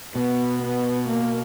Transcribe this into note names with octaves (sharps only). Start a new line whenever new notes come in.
B2 B3
B3
A#3